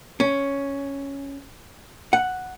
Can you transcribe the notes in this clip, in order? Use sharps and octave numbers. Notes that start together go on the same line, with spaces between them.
C#4
F#5